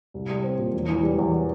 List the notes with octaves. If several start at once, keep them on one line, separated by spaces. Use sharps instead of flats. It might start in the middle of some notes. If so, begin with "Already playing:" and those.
C2
G3
C4
A#2
E1
E3
G3
E2